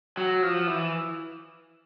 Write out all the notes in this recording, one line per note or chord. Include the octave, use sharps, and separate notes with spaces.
F#3
F3
E3